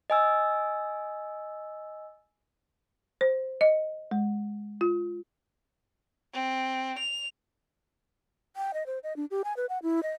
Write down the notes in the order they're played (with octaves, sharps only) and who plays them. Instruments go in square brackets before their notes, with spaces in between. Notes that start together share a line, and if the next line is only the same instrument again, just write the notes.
[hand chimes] D#5 G#5 E6
[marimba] C5
D#5
G#3
F4
[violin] C4
F7
[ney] G5
D#5
C5
D#5
D4
G4
G#5
B4
F#5
E4
D#5